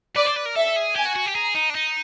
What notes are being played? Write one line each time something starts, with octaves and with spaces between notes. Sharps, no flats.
B4 D5
C5
B4
A#4
A4 E5
G#4
G4 G#5
F#4
F#4
G4
G#4 A#5
D#4
D4
D#4